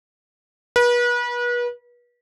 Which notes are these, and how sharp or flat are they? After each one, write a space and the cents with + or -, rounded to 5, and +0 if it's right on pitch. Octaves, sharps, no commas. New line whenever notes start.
B4 -35